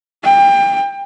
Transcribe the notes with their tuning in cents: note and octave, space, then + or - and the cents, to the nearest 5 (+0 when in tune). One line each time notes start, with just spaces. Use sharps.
G5 +25